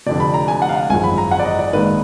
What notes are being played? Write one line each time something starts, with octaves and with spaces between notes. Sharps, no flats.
F1 F2 D3 D5
B5
A#5
G#5
F#5
F5
F#5
G#1 F#2 F3 G#3 G#5
B5
A#5
F#5
D5
D#5
D5
G#1 G#2 D#3 A#3 B4